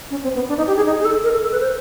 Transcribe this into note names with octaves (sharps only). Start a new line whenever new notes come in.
C#4
C4
B3
D4
D#4
G4
G#4
D#4
G#4
A4
A#4
A4
A4
B4
C5